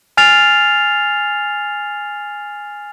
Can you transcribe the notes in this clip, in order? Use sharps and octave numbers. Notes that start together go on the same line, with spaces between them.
G#5 F6 A6 C7 F7